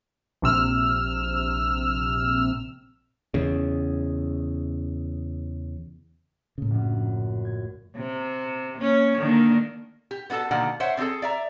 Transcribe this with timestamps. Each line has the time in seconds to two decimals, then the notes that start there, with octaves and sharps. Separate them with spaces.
0.42 A#1 C3 E6 F6
3.34 E2 C#3
6.58 A2 C#3
6.71 A#1 F#2
7.45 G#6
7.96 C3
8.78 A#3 C#4
9.18 D3 D#3 A#3
10.11 G4
10.30 B3 D4 F#4 A4 A5
10.51 B2 D3 D#3 A#3 F#5
10.80 C5 C#5 E5 F#5 G5
10.97 D3 C4 F#4 G#4 A4
11.22 D5 E5 A#5